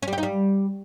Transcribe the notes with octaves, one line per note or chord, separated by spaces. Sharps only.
C#4
G3
G4
D#4
G3